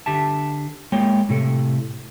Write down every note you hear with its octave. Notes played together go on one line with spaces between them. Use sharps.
D3 G4 E5 A5
G#3 A#3 C#5 G5
A2 C3 A4